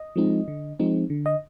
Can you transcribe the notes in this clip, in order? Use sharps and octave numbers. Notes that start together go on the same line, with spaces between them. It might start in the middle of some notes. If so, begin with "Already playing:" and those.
Already playing: D#5
F3 G#3 C4 D#4
D3
F3 G#3 C4 D#4
D3
D#5